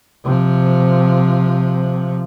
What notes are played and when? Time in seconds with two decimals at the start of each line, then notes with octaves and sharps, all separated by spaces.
0.24 C3 F3